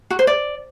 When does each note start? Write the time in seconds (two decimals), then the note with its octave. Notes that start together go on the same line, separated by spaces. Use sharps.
0.10 F#4
0.19 C5
0.27 D5